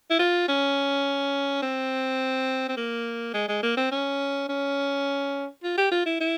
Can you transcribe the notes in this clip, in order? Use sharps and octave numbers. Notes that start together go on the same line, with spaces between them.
E4
F4
C#4
C4
C4
A#3
G#3
G#3
A#3
C4
C#4
C#4
F4
G4
F4
E4
E4